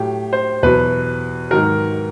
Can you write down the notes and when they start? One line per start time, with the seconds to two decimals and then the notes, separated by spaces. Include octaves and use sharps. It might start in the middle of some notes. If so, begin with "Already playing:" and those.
Already playing: A2 F#3 G4
0.33 C5
0.63 E2 B2 F#3 B4
1.50 G#2 D#3 F#3 A#4